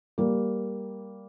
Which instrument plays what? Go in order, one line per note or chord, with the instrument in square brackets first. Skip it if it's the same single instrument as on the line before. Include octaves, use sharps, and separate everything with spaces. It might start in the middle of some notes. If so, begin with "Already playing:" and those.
[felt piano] G3 A#3